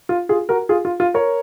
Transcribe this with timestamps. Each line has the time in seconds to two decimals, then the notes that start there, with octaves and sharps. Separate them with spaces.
0.09 F4
0.29 F4 G#4
0.49 F#4 A#4
0.69 F4 G#4
0.85 F4
1.00 F4
1.14 A#4 C#5